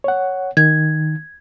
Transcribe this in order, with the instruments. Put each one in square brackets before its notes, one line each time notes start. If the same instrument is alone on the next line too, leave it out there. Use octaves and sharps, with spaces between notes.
[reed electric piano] C#5 F#5
[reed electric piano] D#3 [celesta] G#6